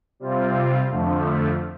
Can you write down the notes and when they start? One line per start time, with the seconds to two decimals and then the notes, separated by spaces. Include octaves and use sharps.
0.20 C3 G3 C4 F4
0.90 F2 D3 F3 A3